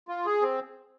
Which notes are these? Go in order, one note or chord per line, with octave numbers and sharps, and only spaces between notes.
F4
G#4
C4